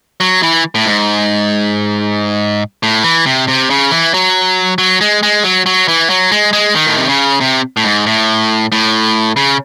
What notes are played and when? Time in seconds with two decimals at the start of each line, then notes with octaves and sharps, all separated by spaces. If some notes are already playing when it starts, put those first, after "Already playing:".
0.20 F#3
0.43 E3
0.75 A2
0.86 G#2
2.83 A2
3.04 E3
3.26 C3
3.48 C3
3.70 C#3
3.91 E3
4.14 F#3
4.78 F#3
5.01 G#3
5.23 G#3
5.44 F#3
5.66 F#3
5.88 E3
6.10 F#3
6.32 G#3
6.53 G#3
6.75 D#3
6.87 A2
6.98 C3
7.08 C#3
7.41 C3
7.77 A2
7.84 G#2
8.06 A2
8.72 A2
9.36 C#3